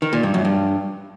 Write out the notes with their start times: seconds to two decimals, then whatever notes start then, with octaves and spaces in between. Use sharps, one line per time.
0.02 D#3
0.13 A#2
0.23 G2
0.34 F#2
0.45 G2